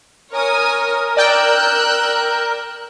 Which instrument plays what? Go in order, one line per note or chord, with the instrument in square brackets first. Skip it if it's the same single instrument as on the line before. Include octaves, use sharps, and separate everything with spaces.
[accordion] A#4 [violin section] C#5 G#5 D#6
[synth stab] D5 G5 [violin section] E6 F#6 G6